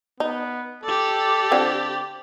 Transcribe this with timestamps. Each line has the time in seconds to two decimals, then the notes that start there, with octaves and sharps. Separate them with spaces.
0.20 B3 D#4
0.84 G4 A4 D5
1.51 D3 C4 F4